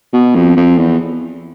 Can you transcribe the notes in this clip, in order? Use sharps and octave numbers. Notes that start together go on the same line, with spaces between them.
B2
F2
F2
E2